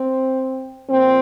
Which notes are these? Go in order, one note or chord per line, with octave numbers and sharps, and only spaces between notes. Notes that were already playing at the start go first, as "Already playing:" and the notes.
Already playing: C4
A#2 F3 C4